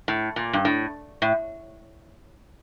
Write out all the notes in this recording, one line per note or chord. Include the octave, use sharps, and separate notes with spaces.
A2
A#2
G2
A2
A2